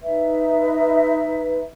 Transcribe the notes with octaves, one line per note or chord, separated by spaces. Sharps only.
D#4 B4 E5